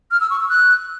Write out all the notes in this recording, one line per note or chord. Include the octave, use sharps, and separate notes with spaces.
F6
E6
C#6
E6
F#6